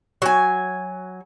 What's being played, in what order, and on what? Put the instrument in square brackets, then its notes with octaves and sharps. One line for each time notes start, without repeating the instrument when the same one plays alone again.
[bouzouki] F#3 G#5